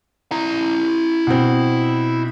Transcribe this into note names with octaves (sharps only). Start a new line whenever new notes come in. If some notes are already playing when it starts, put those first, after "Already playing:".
E4 A#5
B2 C4